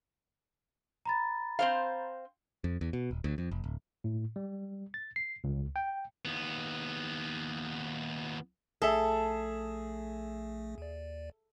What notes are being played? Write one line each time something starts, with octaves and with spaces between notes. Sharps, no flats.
A#5 B5 A6
C4 C5 F5
F2
E2
B2
D#1
D2
F2
F1
D1
A2
G3
A6
C7
C#2
G5
D#2 B3
A#1 A3 G#4 A4 E5
D#2 D5